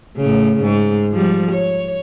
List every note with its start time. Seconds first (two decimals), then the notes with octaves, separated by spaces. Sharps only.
0.17 A2 C#3
0.62 G#2
1.12 F3 G3
1.52 C#5